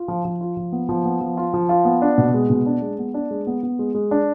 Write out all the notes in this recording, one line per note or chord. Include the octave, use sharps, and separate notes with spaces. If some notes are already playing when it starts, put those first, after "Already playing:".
Already playing: F4
F3
F3
F4
F3
B3
F3
B3
F3
F4
F3
F4
B3
D4
B2
G#3
B2
D4
G#3
B3
D4
G#3
B3
B3
G#3
G#3
D4